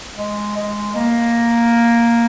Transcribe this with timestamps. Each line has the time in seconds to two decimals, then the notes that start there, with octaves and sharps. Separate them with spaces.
0.18 G#3
0.56 G#3
0.95 A#3